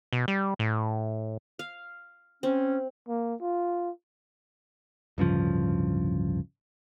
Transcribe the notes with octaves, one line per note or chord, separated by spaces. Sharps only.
B2
G3
A2
F5
C4 C#4
A#3
F4
D1 G2 C#3 F3